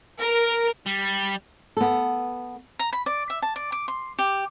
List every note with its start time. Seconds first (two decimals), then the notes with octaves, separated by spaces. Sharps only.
0.20 A#4
0.86 G3
1.77 B3 A4
2.79 A#5
2.93 B5
3.06 D5
3.30 E5
3.42 A5
3.56 D5
3.72 D6
3.88 C6
4.19 G4